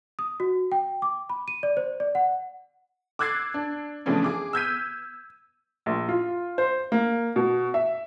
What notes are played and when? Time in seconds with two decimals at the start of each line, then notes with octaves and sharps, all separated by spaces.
0.19 D#6
0.40 F#4
0.72 G5
1.02 D6
1.30 B5
1.48 D#7
1.63 D5
1.77 C5
2.00 D5
2.15 F#5
3.19 D6 E6 F#6 G#6 A6 C7
3.54 D4
4.06 A2 C#3 E3 F3 C#4 D4
4.24 G#4 D6
4.53 E6 F6 G6 G#6 B6 D#7
5.86 A#1
6.09 F4
6.58 C5
6.92 A#3
7.36 B2
7.74 E5